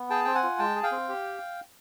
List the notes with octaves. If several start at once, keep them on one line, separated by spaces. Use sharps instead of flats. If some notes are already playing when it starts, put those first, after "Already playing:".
Already playing: B3
G#4 G5 A5
C4 G5
F#5 G#5
F4
G#3 G5 A5
G#4
F5 G5
C4
G4